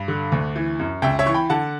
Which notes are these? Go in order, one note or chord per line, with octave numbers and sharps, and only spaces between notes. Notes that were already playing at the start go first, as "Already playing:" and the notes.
Already playing: G2
D3
D2
E3
F#2
C#2 E5 G5
C#5 E5
E3 C#6
G5 B5
D3 F#5 A5